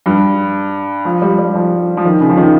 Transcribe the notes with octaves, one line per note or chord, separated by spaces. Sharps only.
G2
F3
G3
G3
F3
F3
D#3
C#3
F3
D#3